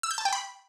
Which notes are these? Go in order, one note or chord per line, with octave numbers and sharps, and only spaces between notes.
E6
G6
A5
G5
B5